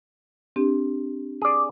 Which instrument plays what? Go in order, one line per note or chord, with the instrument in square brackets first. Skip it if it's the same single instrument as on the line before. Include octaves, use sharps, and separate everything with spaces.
[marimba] C4 D4 G4
[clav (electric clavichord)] G#4 D5